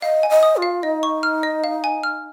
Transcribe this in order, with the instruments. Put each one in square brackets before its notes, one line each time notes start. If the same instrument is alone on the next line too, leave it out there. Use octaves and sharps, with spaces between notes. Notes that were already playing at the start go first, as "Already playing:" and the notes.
[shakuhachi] D#5 [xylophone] F5
[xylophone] G#5
[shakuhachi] D#5
[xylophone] D#6
[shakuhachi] F4
[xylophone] F5
[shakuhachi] D#4 [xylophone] D#5
[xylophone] C#6
F6
D#5
F5
G#5
F6